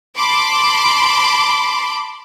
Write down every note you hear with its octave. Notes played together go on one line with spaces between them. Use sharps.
A5 B5 C6 D6